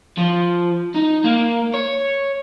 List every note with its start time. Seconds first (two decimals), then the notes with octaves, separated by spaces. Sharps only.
0.18 F3
0.95 D#4
1.24 A#3
1.74 C#5